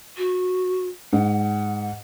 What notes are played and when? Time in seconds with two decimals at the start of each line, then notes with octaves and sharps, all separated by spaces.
0.17 F#4
1.13 G#2 F#5